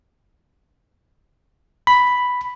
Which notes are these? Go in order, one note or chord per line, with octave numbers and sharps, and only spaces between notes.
B5